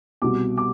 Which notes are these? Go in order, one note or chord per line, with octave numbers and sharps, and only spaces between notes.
C2 B2 D6
D6